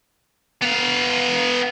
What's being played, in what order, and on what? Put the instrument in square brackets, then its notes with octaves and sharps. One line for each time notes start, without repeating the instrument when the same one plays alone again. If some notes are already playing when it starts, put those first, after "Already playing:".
[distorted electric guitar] B3 F5